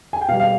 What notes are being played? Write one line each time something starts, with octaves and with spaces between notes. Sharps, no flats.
G#5
G5
B2 G3 F5
F5